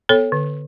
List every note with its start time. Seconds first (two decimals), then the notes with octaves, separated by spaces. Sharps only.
0.09 B3 A4 C#5
0.32 D3